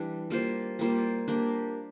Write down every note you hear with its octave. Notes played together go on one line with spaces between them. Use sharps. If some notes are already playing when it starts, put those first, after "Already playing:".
Already playing: E3 G3 D4
G3 A#3 F4 C5
G3 A#3 F4 C5
A#3 D4 G4